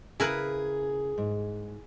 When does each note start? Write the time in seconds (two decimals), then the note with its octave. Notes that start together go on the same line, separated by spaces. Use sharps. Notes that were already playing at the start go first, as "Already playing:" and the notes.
0.20 C#3 E4 G#4 A#4 B4
1.18 G#2